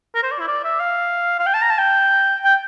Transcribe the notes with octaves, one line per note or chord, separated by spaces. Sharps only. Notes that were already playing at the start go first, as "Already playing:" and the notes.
A#4
C5
D5
E4
D5
E5
F5
F5
G5
A5
A#5
A5
G5
G5